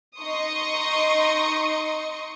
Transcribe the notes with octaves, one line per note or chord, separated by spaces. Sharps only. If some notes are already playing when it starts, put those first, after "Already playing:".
D#4 D#5 C6 C#6 D#6 C#7